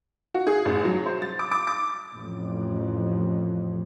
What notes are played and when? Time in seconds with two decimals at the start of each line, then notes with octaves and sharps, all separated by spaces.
0.34 F#4
0.47 G#4
0.65 A1
0.85 F#3
1.06 C5
1.22 A6
1.39 D6
1.51 D6
1.67 D6
2.15 A1 F2